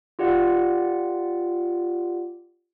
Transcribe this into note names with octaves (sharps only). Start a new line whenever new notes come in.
F4 G4 D5 F#5